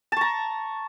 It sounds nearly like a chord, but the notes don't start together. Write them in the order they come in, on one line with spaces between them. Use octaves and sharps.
A5 C#6 A#5